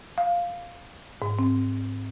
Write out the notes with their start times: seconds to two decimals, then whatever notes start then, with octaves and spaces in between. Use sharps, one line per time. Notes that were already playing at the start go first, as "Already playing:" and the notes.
0.18 F5
1.22 G#2
1.39 C4